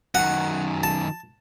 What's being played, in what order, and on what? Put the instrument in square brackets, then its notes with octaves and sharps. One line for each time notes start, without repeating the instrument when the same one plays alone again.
[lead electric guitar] F#2 D#3 [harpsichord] F#5
[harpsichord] A5